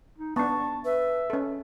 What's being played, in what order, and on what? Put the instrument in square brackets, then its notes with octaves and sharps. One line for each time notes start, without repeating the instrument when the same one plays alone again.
[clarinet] D#4
[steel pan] B3 D4 [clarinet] A5 [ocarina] C#6
[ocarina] B4 [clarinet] E5
[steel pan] C#4 A4